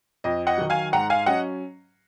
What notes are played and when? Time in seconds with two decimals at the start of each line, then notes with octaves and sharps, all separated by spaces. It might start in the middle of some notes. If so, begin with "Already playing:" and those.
0.24 F2 D#5
0.47 D#5 F#5
0.58 D#3 F#3
0.70 F5 G#5
0.92 G#2 F#5 A#5
1.10 F5 G#5
1.26 F#3 C#4 D#5 F#5